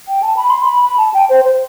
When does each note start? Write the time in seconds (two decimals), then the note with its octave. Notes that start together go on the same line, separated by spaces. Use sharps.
0.08 G5
0.22 A5
0.37 B5
0.50 C6
0.65 B5
0.82 B5
0.97 A5
1.14 G5
1.30 C5
1.45 C5